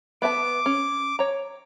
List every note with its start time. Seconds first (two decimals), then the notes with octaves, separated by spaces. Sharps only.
0.22 B3 E5 A5 D6
0.66 C#4
1.19 C#5 A#5